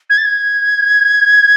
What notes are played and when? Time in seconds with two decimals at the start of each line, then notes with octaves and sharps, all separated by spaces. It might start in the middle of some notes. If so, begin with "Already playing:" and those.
0.10 G#6
0.18 A6
0.25 G#6